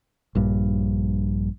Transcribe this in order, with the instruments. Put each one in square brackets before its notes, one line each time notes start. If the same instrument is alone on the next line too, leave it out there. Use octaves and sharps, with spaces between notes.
[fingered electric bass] A#1 G2